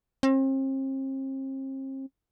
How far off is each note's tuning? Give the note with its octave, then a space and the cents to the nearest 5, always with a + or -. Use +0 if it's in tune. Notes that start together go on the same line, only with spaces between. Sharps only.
C4 +40